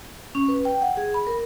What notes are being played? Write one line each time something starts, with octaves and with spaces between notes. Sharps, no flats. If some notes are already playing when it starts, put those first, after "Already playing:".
C#4
B4
G5
F#5
G#4
B5
A#4